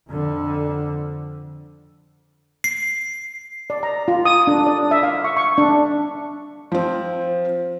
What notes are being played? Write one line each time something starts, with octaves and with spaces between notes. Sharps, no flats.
F2 D3
C7
D5
A#5
F4
D#6
D4
D5
E5
F5
C#6
C#6
D4
F3 C4